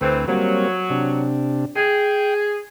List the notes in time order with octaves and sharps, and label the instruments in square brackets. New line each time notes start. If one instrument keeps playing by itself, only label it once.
[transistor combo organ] D2 B4 [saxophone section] E3 A3 C4
[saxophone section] F#3 [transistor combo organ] G3 A#3 C4
[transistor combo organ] C3 D4
[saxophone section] G#4 [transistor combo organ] G5